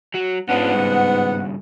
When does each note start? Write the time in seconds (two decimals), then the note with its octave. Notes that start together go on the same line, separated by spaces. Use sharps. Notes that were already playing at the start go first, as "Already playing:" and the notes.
0.14 F#3 F#4
0.49 G#2 B3 C#4 D4 F4 F#5
0.73 G2 C#3